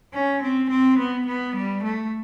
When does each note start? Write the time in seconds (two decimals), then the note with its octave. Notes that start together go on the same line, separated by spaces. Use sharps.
0.14 C#4
0.43 C4
0.71 C4
0.99 B3
1.27 B3
1.56 G3
1.84 A3